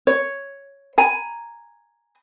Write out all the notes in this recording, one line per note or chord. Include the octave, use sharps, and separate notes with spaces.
C#5
G#5 A#5